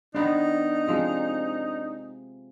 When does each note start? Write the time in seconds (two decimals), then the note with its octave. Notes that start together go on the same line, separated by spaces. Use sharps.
0.15 D#3 B3 D4 D#4 C5
0.87 C3 F3 G#3